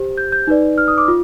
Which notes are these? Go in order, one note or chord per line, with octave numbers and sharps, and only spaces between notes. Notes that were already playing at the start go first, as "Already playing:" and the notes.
Already playing: G4 C5
G6
G6
D#4 B4 D5
F6
D#6
D6
F4